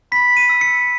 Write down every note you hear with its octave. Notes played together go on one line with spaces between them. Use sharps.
B5 B6
D#7
E6
C#7